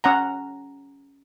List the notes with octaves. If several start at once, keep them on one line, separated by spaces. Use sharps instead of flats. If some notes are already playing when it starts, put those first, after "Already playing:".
C#4 F#5 A#5